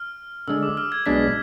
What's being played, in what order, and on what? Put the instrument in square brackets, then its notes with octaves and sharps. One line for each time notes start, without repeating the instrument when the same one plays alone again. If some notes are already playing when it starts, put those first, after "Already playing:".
Already playing: [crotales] F6
[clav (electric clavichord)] D3 G#3 D4 [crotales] E6
[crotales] D6
F6
G#6
[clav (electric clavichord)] B1 B2 G#3 D4 [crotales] B6